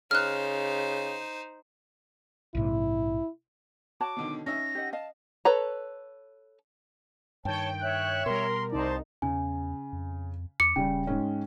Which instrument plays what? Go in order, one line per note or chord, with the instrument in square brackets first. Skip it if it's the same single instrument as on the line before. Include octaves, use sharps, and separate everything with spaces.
[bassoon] C#3 [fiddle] D#4 C5 [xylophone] F6 F#6
[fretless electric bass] A#1 G#2 C3 [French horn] E4
[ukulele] F#4 C#5 A5 [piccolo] D6
[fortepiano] B2 D3 D#3
[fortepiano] C#4 D#4 E5 [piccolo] A#6
[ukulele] G4 D#5 F#5
[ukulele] D#5 F5 [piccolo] A5
[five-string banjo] A4 B4 C#5 A#5
[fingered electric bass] G2 D#3 [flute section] C#5 A5 [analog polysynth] G5
[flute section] C#5 E5 [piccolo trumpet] F#6
[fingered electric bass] B2 G3 [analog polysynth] A#4 [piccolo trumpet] C6
[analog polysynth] C2 D#4 [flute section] C5 A5 [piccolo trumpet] D5
[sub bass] E2 [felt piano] C#3 [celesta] G#5
[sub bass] F2
[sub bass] E2 [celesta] D6 [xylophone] C#7
[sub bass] D#1 [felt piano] C#3 G3 [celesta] G5
[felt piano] G#2 G#3 C#4